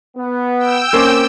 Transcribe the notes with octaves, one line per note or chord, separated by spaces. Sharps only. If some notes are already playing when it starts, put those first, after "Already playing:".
B3
G5 E6
A#3 C4 C#4 D5